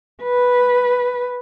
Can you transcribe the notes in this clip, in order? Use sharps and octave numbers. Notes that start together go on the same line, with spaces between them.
B4